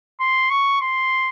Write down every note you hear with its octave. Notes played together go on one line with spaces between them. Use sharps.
C6
C#6
C6